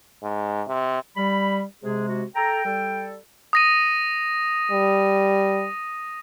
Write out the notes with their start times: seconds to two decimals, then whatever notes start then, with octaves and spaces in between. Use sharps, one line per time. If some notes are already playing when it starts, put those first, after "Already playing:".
0.23 G#2
0.67 C3
1.16 G3 B5
1.84 C3 G#3 G#4
2.09 F#4
2.36 A4 G5 A#5
2.65 G3 A4
3.53 D#6 A#6 D#7
4.71 G3